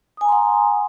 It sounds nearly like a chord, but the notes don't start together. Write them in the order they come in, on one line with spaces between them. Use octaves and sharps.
D#6 G#5 A#5 C6 F#5